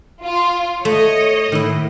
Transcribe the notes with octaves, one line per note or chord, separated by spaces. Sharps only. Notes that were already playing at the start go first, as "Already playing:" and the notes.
F4
A3 C#5 D#5
A2 D#3 E4